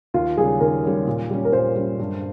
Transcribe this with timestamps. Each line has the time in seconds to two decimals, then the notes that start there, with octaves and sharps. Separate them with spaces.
0.14 D#2 F4
0.37 C#3 G3 G#4
0.60 D#2 A#4
0.84 C#3 G3
1.07 A#2
1.30 G3 C#4
1.45 A#4
1.52 A#2 C5
1.76 G3 C#4
1.99 G2